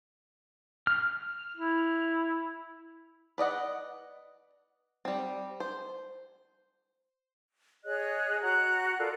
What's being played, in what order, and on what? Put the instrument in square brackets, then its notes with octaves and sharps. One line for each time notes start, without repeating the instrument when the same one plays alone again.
[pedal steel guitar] F6
[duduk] E4
[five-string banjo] B4 D5 D#5 F#5
G3 C4
C5
[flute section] G#4 C#5 D#5 F#6
F#4 F#5 A#5 F#6
F4 A4 A#4 D5